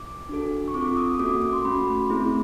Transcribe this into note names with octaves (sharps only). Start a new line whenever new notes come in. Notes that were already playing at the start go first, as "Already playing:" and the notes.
Already playing: D6
D4 F#4 A4
C#6
C4 F4 A4 D6
D6
D#6
A#3 C#4 F#4 A4 D6
D6
D6
C6
A3 C#4 F#4 B5
A3 C4 E4 G#4